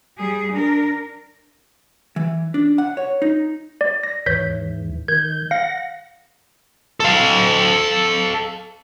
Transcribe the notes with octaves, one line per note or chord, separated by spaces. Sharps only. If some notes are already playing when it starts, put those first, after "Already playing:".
G3 G#4
D4 A#4
E3
D4
F#5
C#5
D#4
D5
A#6
D#2 G#2 E3 C#5 G6 B6
D#3 G6 G#6
F5 F#5 A#6
A4 F5